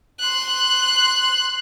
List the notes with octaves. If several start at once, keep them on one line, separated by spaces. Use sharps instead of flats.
C6 F#6